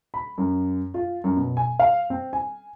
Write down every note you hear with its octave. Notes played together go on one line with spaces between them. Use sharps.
B5
F#2
F4
F#2
B2
G#5
F5
C4
G#5